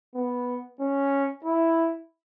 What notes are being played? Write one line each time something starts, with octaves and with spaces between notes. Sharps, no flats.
B3
C#4
E4